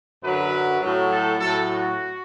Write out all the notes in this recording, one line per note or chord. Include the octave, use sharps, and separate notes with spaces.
F#2 D3 F#3 B4
A2 F#3
A4
A2 F#3 A4
F#4